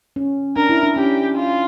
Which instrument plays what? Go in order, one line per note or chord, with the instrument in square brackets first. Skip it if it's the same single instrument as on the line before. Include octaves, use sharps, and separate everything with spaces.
[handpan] C#4
[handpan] D4 [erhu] A#4
[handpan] E4
D4
[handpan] C#4 [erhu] G4
[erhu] F4